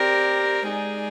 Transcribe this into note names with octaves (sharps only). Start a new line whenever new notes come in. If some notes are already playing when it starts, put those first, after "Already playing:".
Already playing: C4 G4 A#4 D5
G#3 D#4 G#4 D5